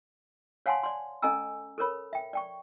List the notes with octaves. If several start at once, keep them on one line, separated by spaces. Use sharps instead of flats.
C#5 F5 F#5 G#5 A5 C6
D5 C6
C#4 A4 D#5 G#5 A#5 E6
A4 A#4 C#5 B5
E5 G5
D5 G5 C#6